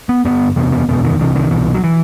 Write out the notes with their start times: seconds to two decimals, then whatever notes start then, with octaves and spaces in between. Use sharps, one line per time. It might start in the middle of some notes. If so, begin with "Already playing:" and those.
0.09 B3
0.25 G1 F#2 B3
0.56 F#1 E2 C3 B3
0.72 B3
0.89 F#1 E2 B2 B3
1.04 D#3
1.19 C2 C3 E3
1.36 D#3
1.51 C2 B2 E3
1.74 F#3
1.84 E3